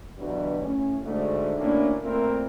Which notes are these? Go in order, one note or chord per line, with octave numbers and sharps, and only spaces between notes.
G2 B2 D3 E3 F#3 G3
A2 C#4
D2 G#2 D3 A3
D2 A2 A#3 C#4 D4
A#2 A3 C4 E4 A#4